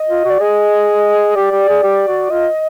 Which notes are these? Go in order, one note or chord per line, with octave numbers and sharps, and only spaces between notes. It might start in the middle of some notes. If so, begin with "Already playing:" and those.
Already playing: D#5
F4
F#4
D5
G#4 D#5
G4 D5
G4
G#4
G4
F#4
F4 D#5